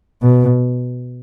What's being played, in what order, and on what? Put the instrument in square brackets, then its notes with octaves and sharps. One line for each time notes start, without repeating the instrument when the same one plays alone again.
[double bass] B2